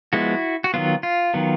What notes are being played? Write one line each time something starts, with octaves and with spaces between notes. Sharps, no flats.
F3 G#3 B3 E4 F#4
F#4
D#3 F#3 B3 F4
F4
D#3 F#3 B3